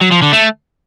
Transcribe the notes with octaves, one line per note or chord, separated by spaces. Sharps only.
F#3
F3
D3
A3